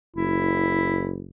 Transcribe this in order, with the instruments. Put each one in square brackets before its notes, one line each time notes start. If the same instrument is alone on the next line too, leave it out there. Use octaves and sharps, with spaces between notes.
[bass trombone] F#1 [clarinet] E4